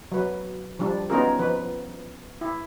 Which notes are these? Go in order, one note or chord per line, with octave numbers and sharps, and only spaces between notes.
F#3 B4
F3 G3 D4
B3 C#4 D#4 F4 G#4 A#4
F3 B4
E4